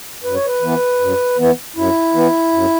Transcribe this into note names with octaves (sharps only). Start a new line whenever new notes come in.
F#2 B4
C#5
B4
E3 B3
F#2
E3 B3
F#2 E4
E3 B3
F#2